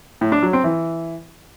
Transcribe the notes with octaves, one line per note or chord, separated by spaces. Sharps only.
A2
D4
F#3
C4
E3